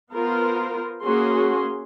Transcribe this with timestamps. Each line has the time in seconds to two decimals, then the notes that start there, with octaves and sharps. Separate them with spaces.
0.14 B3 F4 A#4 C5
1.03 A#3 C#4 F#4 G#4 C6